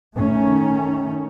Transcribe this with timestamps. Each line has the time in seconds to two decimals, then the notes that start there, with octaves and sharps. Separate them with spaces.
0.16 D#3 A3 C#4